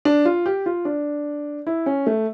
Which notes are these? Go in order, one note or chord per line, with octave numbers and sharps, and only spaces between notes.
D4
F4
G4
F4
D4
E4
C#4
A3